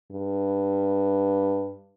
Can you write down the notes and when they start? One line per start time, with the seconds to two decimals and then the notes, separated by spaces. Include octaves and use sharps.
0.12 G2